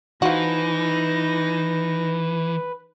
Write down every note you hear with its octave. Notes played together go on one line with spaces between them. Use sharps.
E3 F3 D#4 F#4 B4 A#6